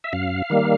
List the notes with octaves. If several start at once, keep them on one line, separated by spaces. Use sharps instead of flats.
E5
F#2 F5
D#3 G3 A#3